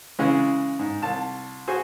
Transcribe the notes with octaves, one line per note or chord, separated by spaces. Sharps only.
C#3 E3 G#3
G#2
C2 A5
F#4 G#4 C5 G#5